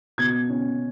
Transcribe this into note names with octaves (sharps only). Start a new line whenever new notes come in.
B2 G#6
C#4